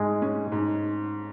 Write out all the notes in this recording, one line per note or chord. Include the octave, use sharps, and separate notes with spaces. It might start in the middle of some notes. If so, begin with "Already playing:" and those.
Already playing: G#2 G#3
C#4
G#2